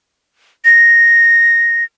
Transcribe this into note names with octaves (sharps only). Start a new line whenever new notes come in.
A#6